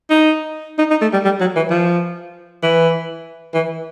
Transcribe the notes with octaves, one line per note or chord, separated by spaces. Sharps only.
D#4
D#4
D#4
A3
G3
G3
F#3
E3
F3
E3
E3